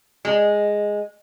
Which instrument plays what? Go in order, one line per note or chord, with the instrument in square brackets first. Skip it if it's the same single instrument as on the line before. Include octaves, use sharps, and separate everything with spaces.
[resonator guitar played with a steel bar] G#3